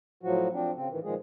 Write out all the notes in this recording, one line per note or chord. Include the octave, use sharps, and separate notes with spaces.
A2 F3 F#3 F#4
F3 C4 D4
C#3 C4
A2 D#3 E3
A#2 D#3 F3 G#3 G#4